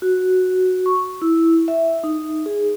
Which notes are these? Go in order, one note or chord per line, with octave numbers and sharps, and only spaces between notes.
F#4
C#6
E4
E5
D#4
G#4